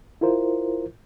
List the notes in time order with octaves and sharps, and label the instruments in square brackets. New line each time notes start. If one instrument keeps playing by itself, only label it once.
[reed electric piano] E4 F4 A#4 C5